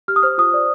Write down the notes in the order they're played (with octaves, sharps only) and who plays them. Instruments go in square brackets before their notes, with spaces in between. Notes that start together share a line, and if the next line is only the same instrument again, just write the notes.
[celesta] G4 F6
D#6
C5 F6
F4 D#6
D5